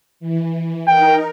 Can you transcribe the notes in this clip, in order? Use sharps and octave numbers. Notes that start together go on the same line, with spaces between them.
E3
D#4 A#4 G5